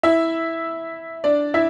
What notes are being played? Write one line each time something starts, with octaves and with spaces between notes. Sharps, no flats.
E4 E5
D4 D5
E4 E5